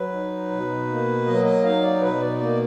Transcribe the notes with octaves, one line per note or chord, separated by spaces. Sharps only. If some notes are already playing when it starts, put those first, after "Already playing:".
Already playing: F#3 B4
D#4
B2
A#3
F#3 D#5
D#5
D#4 F5
D5
B2 B4
D5
A#3 D5